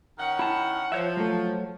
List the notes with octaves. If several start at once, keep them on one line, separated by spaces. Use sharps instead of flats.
D#3 C#4 F#5
E4 A5
F3 C#5 E5
F#3 A3